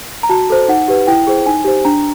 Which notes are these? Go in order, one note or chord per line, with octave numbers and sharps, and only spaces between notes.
A#5
F#4 A5
A4 C5
D#4 F#5
G4 B4
E4 G5
G#4 C5
D#4 G#5
G4 C5
D4 A#5